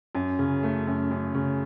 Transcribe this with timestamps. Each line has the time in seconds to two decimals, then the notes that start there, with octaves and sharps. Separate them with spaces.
0.15 F#2
0.39 C#3
0.63 A3
0.87 F#2
1.11 F#2
1.35 C#3